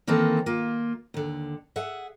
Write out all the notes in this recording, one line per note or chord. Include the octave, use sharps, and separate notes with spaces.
D#3 E3 A#3 C4 A4
A#3 F4
D#2 D3
G#4 E5 F#5